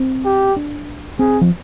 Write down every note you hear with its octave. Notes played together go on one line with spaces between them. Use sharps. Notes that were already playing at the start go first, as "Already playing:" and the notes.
Already playing: C4
G4
D4
C4 G#4
F3